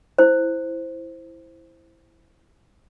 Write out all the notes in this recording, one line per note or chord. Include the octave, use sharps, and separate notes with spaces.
E4 C5